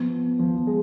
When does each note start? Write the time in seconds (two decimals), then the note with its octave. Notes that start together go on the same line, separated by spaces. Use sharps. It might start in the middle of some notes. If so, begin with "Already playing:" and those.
Already playing: F3 B3
0.39 F3
0.56 F3
0.67 G#3